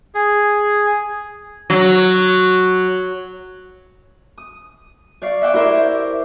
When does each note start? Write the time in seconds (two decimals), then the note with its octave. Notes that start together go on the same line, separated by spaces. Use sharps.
0.15 G#4
1.70 F#3
4.38 D#6
5.22 C#5 D5 F5
5.42 E5 F#5 G5 D6
5.54 E4 G4 A#4 C5 C#5 E5